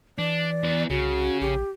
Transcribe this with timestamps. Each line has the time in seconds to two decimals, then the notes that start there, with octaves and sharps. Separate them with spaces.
0.19 E3 D4 D5
0.64 E2 B4
0.90 C2 C#3 F#4
1.41 A#1 G4